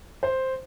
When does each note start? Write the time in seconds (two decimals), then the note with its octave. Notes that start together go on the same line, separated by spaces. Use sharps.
0.23 C5